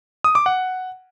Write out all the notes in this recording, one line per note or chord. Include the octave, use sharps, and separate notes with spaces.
D#6
D6
F#5